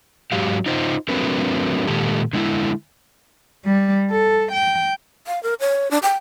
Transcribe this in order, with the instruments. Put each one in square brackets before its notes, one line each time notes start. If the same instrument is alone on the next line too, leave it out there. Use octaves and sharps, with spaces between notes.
[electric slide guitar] G#2 F#3 G4 F5
D#4 F4 C5
F#3 A3 C4 D4 A#4 B4
A#2 D#3 G#3 G4 A4
D3 G#3 E4
[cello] G3
A4
G5
[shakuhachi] F5
A#4
C#5
D4
G5